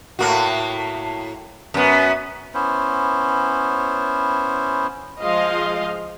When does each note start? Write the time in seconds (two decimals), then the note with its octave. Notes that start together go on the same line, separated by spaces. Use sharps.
0.19 A2 A#3 F#4
1.74 F#2 B3
2.54 B3 C#4 E4 C5
5.22 F3 G#3 D#5 F5 C6